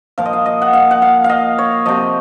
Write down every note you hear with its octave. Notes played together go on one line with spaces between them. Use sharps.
A#2 F3 F5
D#5
F5
D#5
F#5
F5
F#5
F5
F5
D#5
C#5
C3 F3 D#5